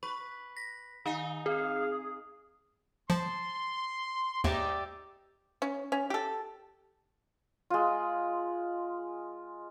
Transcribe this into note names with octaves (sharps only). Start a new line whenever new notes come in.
B4 C#6
A#6 B6
D#3 D#4 F5 G#5
C4 G#4 F5
F3 A5 C6
D#2 G#2 D#4 G4 D5 E5
C#4
C#4
G4 A4
G#3 F4